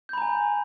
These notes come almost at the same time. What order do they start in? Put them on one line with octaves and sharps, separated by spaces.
G6 B5 A#5 G#5